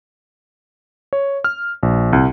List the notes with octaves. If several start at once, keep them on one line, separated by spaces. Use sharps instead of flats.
C#5
F6
A#1
C2